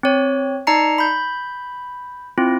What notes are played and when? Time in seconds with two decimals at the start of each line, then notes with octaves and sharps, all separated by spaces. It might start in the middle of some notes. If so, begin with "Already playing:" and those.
0.03 C4 C#5
0.67 D#4 D5 A5 A#5 C7 C#7
0.98 B5 G6
2.38 C4 E4 F4